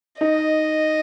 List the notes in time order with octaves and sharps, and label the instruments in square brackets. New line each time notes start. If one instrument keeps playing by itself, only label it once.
[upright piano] D#4 [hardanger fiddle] D#5